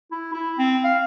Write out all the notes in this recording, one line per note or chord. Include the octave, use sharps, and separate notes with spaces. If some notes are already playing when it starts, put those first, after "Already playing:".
E4
E4
C4
F5